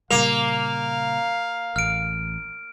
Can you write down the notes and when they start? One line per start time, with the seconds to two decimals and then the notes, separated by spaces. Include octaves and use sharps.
0.11 A#2 C#3 G3 A#3 F5 F7
1.76 A1 F6 D7